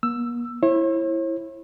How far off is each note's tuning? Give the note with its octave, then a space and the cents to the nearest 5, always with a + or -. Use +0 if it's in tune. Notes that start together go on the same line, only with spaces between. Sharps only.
A#3 +45 E6 +10
E4 +5 C#5 -45